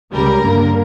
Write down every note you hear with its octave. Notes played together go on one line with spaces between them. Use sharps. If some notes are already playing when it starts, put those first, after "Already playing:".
C#2 C#3 G3 A#4
G2 D3 A#3